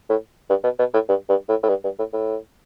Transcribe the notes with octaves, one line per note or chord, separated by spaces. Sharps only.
A2
G2
B2
B2
A2
G2
G2
A2
A2
G2
G2
A2
A2